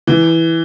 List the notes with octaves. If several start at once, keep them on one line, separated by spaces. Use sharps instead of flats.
E3